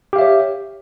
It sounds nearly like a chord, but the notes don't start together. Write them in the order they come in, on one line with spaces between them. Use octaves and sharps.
G4 F5 E5 C#5